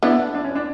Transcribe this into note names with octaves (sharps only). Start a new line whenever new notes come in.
B3 D4 E4
D4
C#4
D4